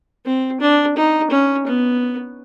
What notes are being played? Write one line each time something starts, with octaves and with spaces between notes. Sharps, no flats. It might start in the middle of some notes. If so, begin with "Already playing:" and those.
C4
D4
D#4
C#4
B3